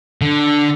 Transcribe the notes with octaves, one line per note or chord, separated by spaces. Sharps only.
D3